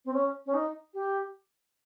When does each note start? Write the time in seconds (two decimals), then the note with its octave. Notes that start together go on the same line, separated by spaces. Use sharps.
0.05 C4
0.13 C#4
0.46 C#4
0.53 D#4
0.93 G4